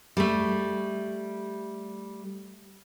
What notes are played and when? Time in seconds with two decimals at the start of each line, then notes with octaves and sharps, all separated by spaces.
0.17 G3 A3